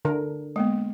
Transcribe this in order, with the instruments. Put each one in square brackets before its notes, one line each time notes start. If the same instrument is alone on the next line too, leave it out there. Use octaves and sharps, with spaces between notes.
[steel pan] D3 A#4
[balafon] G#3 A#3 B3